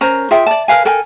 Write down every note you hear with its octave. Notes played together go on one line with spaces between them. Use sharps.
C#4 A#4 C5 A#5
F4 G#4 E5 G5
D5 A5
A#4 B4 F5 G#5
A4 A#4 G5 G#5